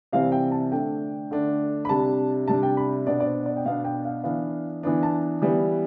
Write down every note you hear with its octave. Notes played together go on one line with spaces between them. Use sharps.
C3 E3 G3 C4 F5
G5
A5
D3 A3 D4 G5
D3 A3 D4
B5
C3 G3 D4 A5
C3 G3 D4 A5
G5
B5
B2 B3 D4 D5
D5
C5
D5
G5
B2 B3 D4 F5
G5
F5
E3 B3 D4 F5
E3 B3 D4
A5
E3 G3 B3